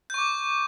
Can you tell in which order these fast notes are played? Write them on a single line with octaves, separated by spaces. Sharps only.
G6 C#6 D6